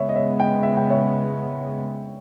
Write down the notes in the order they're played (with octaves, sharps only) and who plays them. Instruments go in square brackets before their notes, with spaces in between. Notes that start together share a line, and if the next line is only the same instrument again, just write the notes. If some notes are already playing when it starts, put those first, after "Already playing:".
Already playing: [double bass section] C#3 G#3 B3 [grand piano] C#5 E5
[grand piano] D#5
C#5 E5
D#5 G5
E5
G5
C#5 E5